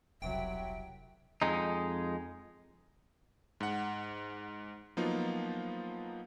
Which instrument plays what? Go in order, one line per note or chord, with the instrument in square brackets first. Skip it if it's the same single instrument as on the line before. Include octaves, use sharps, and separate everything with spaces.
[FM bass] E1 [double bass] C2 F#3 [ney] E5 [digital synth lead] G5
[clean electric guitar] F2 G#3 D#4
[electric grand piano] G#2 F#5
F3 F#3 A#3 B3 D#4 F4